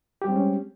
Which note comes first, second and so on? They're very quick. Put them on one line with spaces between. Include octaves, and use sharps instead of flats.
G4 G3 C4 G#3 C#4